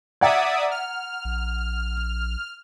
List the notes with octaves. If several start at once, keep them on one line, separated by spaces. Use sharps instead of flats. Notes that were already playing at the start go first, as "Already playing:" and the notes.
D5 E5 F#5 A#5 D#6 G#6
F6
A#1